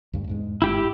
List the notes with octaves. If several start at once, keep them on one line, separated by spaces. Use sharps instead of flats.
D2 G2
E2 G#2 G#3
G1 G#2 E4 G4 G5